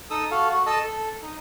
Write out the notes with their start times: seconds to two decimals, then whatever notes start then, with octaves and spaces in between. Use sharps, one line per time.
0.10 D#4 A4 D#6 E6
0.31 F#4 A4 F5
0.49 F#4
0.67 A4 D#5 A5 E6
0.84 A4
1.22 D#4